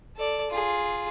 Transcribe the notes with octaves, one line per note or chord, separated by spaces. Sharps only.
A4 D5
F4 G#4